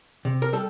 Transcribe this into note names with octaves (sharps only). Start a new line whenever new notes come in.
C3
A#4
G3 A4